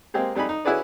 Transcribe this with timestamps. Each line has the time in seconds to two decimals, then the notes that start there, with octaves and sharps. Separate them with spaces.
0.14 G#3 A#3 C4 G4 G#4
0.35 F2 G3 D#4 G#5 B5
0.49 D#4
0.65 C#4 E4 F#4 G#4 B4 D5